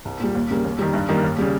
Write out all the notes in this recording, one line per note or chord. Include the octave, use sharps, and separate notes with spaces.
C2
A#2 G3
D#2
C#3 G3 A#3
D#2
D#3 G3
G2
D#3 G3 A#3
D#2
C#3 G3